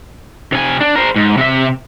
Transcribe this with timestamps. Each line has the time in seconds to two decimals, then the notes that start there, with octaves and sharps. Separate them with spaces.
0.52 C3 G#5
0.81 D4
0.96 A#4 C5
1.16 G#2
1.37 C3 E5